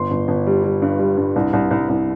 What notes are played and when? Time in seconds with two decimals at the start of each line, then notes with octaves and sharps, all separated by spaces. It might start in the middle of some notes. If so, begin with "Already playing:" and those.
Already playing: G1 C6
0.11 G1
0.28 G1
0.47 G3
0.64 G3
0.82 G2
0.99 G3
1.17 G2
1.36 C2
1.53 C2
1.71 C2
1.89 C2